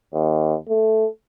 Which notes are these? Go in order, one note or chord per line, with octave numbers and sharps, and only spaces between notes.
D#2
A3